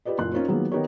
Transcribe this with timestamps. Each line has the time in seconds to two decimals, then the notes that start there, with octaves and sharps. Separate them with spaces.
0.05 F4 G4 B4 D5 D#5
0.18 F#1 A#2 C6 F#6
0.32 C#4 D#4 F4 A#4 C5 C#5
0.48 D#3 F#3 G#3 A#3 B3 F4
0.72 D#3 B3 D#4 G4 A#4 C#5